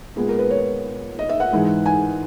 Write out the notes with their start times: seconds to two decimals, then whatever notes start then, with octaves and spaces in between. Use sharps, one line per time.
0.16 A#2 G#3 B3 G#4
0.28 A#4
0.39 B4
0.50 C#5
1.19 D#5
1.29 E5
1.40 F#5
1.52 G#2 E3 G#3
1.86 G#5